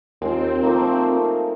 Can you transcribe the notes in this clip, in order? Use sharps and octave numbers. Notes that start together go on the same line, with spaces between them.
D#2 G#3 C4 F4
F3 A3 A#3 D#4